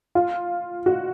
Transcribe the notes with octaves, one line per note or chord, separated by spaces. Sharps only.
F4
F#4